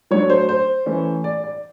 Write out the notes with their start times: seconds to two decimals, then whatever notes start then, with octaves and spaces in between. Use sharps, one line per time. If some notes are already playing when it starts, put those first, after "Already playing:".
0.11 F#3 A3 D4 C#5
0.30 C5
0.49 C5
0.86 E3 A3 C#4
1.24 D5
1.44 D5